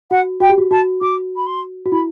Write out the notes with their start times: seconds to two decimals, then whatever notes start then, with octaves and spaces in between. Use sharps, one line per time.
0.11 F#4 F#5
0.40 F#4 G5
0.50 G4
0.58 F#4
0.71 F#4 A5
1.01 F#4 D6
1.36 B5
1.46 C6
1.86 F#4
1.92 E4 B5